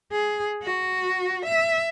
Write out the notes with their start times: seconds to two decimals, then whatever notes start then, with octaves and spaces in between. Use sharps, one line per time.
0.12 G#4
0.63 F#4
1.45 E5